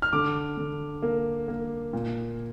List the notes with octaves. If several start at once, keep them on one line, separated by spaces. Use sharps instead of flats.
F6
D3 D6
D3
A#3
A#3
A#2